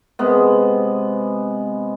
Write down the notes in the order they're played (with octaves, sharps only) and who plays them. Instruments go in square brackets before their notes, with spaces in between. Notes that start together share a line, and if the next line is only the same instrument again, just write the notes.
[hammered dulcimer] C3 G#3 B3